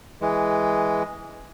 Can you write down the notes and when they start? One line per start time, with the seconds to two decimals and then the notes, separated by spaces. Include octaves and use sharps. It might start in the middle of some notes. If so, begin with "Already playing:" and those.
0.21 E3 G#3